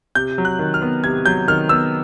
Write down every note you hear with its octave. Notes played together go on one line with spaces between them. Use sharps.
C3 G6
F#3
F#6
D#3
F6
B3
C3 G#6
F#3 G6
D#3 F6
B3 E6